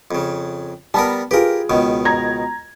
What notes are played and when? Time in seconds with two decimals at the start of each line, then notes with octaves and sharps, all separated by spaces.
0.11 F2 C#3
0.94 G3 B3 A#4 A5
1.31 F4 G4 G#4 A#4 B4
1.70 C#2 B2 D#3
2.05 A#5 G#6